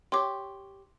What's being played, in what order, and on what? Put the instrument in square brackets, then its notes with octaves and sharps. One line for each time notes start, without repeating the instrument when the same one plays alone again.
[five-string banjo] G4 C#5 [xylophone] C6 D6